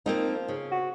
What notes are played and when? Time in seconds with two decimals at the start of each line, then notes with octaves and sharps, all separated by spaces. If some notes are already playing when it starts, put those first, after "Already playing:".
0.06 F3 A#3 C4 D#4
0.48 C#3
0.71 F#4